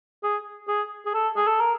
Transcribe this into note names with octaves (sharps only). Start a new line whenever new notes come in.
G#4
G#4
G#4
A4
G#4
A4
A#4